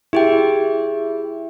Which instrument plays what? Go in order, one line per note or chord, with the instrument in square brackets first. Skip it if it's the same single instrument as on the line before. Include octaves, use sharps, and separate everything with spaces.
[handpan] E4 [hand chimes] G4 G#4 G5